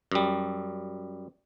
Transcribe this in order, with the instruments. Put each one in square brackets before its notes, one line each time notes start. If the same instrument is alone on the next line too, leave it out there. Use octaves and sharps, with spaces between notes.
[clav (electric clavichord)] F#2 G3